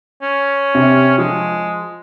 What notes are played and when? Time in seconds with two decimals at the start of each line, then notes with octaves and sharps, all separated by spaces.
0.22 C#4
0.75 C3
1.18 F3 G#3